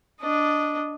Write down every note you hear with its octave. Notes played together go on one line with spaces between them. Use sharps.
D4 D#5